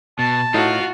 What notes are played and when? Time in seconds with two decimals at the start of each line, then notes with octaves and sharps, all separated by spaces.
0.19 B2 A5
0.54 A2 D#4 F4 F#4